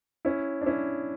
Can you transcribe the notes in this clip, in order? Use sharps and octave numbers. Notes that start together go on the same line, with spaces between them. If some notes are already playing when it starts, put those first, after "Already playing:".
C#4 E4
D4
C#4 E4